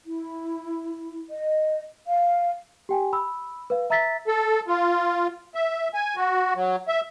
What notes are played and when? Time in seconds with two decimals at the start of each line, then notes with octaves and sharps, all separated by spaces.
0.06 E4
1.31 D#5
2.08 F5
2.89 G4 G5 G#5
3.13 B5 E6
3.70 B4 F5
3.90 E5 A#5 E6 A6 B6
4.27 A4
4.67 F4
5.55 E5
5.94 G#5
6.16 F#4
6.56 F#3
6.88 E5